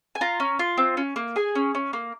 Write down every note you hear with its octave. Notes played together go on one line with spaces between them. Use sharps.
G#5
F4 A#5
C#4
F4
C4
C#4
A#3
G#4 G#5
C#4
C#4
A#3